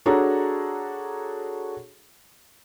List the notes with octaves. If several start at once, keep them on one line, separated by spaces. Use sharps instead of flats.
D4 F#4 G#4 A4 C#5 A#5